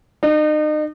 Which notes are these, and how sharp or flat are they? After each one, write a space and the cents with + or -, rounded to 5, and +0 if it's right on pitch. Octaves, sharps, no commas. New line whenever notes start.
D#4 -35